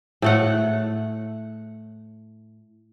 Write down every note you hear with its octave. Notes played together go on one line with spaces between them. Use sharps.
A2 A3 F#5